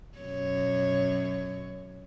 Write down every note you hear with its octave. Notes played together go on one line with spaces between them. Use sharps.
F#2 B2 C#5